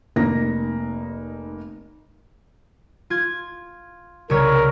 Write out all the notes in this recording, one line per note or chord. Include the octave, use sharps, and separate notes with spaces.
F1 A#3 D#4 A#6
F4 G#6
C2 C#3 A#4 C#5